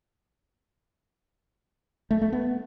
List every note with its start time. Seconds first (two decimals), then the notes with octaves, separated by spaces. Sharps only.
2.11 A3
2.21 A3
2.32 B3